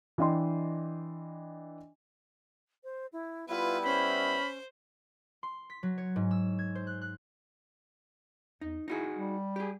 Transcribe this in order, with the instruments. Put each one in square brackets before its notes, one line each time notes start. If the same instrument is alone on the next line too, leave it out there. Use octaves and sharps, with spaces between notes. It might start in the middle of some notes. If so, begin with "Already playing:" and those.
[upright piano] E3 D4 D#5 G5 C6
[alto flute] C5
E4
[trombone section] G3 B3 E4 [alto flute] F4 [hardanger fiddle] B4
[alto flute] C#4 [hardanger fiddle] C5 [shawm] B5
[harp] C6
B6
F#3
C#5
G#2
E6
G#6
C5
F#6
F#6
[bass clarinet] E2 [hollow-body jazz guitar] D#4
[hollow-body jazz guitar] D#4 F#4 G#4 [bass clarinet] E4
[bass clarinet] G3
[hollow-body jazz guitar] G4 G#4